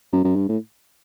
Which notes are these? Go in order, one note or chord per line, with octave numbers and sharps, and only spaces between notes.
F#2
F#2
G2
A2